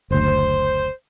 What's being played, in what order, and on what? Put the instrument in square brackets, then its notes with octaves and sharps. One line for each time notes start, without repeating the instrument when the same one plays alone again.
[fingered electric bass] F#1 D2 [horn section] C5